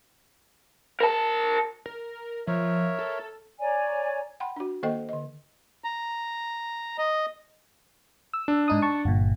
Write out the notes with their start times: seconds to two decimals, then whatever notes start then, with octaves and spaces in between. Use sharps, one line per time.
1.00 A#4 A5
1.86 A#4
2.47 F3 A#4 C#5 E5
2.99 A4
3.60 C#5 D5 G#5 A#5
4.40 F#5 G5 B5 C6
4.56 D4 F#4
4.83 D#3 A#3 A4 C5 D#5 G5
5.09 D3 D#5
5.84 A#5
6.98 D#5
8.33 E6
8.48 D4
8.68 G#2 D#4 D#6
8.82 A5 C#6
9.05 G1 A#2